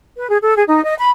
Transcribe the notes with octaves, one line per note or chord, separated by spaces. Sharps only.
B4
G#4
A4
G#4
D#4
D#5
B5